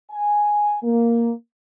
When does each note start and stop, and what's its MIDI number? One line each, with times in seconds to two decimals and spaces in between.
0.11 0.76 80
0.83 1.31 58